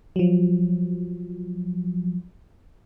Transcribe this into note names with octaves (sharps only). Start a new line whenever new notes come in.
F3 F#3